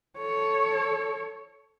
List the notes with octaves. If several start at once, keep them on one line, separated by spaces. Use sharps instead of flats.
A4 C#5